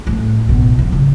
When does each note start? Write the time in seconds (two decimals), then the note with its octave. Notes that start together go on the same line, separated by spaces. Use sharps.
0.07 A2
0.49 B2
0.79 E3
0.92 C#3